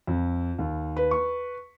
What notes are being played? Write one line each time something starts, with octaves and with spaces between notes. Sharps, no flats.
F2
D#2
B4
C#6